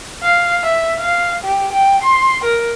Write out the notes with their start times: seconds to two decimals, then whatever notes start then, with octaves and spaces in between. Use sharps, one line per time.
0.23 F5
0.63 E5
0.99 F5
1.44 G4
1.72 G5
2.02 C6
2.44 A#4